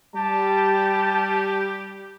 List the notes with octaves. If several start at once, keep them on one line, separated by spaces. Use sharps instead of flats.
G3 G4 A5